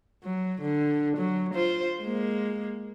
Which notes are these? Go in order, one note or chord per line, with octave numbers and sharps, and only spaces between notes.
F#3
D3
F#3
F4 C5
G#3 A#3